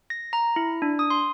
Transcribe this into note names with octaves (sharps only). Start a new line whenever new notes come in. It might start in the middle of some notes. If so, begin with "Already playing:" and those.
A#6
A#5
E4
D4
D#6
C6